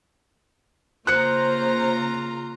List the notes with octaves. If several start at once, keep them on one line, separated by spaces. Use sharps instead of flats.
C#3 A#3 F4 C5 A#5 F#6 C#7